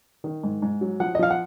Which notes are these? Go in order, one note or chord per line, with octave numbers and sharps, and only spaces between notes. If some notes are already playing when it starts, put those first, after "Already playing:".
D#3
G#2
G#2
F#3
F3 F#5
D#5
F3 F5
F#5